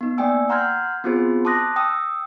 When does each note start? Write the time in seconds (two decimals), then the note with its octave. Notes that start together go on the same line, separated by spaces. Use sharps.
0.01 B3 D#4
0.18 A#3 D5 G5 G#5 E6
0.49 F#5 A#5 C6 F6 G6 G#6
1.04 B3 C4 F4 F#4 G#4 C5
1.45 A5 C6 D6 D#6 F#6 A#6
1.76 G5 D#6 E6